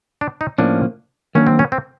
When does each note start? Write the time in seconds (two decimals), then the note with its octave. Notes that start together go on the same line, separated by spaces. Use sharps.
0.21 D4
0.41 D#4
0.58 A2 F3 A#3 C#4 D4
1.35 D#3 F#3 A#3 C#4 D4
1.47 C4
1.59 C#4
1.72 C4